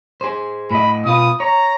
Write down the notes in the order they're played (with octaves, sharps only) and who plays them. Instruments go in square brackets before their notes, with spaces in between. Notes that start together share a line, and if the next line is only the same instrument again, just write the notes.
[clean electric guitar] G#4 C5
[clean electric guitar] A2 D#5 [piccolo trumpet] B5
[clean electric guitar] B2 F4 B4 [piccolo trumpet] D#6
[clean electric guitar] C#5 [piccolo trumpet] A#5